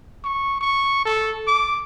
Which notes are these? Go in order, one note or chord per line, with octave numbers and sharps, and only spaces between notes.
C#6
C#6
A4
D6